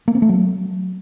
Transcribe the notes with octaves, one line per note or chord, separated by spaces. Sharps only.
A#3
C4
A3
F#3